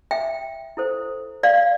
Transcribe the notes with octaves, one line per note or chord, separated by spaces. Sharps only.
E5 G5
E4 A4 C5
D5 F5